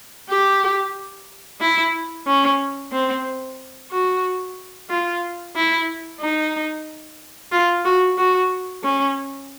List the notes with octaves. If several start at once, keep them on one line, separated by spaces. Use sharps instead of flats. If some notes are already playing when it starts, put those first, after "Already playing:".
G4
E4
C#4
C4
F#4
F4
E4
D#4
F4
F#4
F#4
C#4